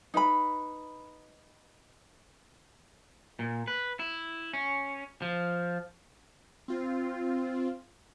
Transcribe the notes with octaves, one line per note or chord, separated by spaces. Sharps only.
D#4 B4 E5 B5
A#2
B4
E4
C#4
F3
C4 F4